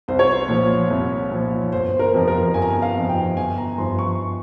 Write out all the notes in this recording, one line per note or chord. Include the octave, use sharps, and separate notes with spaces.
C2 C5
C#5
C5
A#2 F3
C2
A#2 F3
G1 C5
C5
A#4
F2 C3 F3
A#4
G1 G#5
A#5
G#5
F5
F2 C3 F3
G5
G1 G#5
A#5
G2 F3 C6
C#6